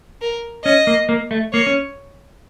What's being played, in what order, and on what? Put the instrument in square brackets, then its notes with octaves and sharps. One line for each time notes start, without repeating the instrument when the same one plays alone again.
[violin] A#4
[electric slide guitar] C#4 [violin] D#5
[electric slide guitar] A#3
A#3
A3
[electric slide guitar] A#3 [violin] C#5
[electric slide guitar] C#4